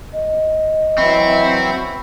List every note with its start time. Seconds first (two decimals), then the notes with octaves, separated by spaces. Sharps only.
0.13 D#5
0.98 E3 F#3 C4 E4 B5 C#6